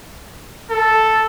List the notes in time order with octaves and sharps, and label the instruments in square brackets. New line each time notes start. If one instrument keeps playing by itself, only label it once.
[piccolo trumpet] A4